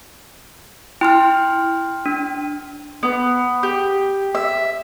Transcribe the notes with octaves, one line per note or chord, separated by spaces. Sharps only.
E4 G5 C6 F6
D4
B3
G4
E5